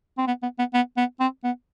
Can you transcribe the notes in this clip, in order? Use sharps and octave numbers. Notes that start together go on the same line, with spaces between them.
C4
B3
B3
B3
B3
B3
C4
B3